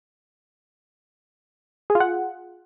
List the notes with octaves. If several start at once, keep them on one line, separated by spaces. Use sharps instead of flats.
G#4
F4
F#5